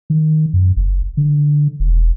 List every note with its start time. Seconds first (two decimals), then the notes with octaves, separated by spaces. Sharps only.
0.10 D#3
0.53 F#2
0.76 F#1
1.17 D3
1.80 E1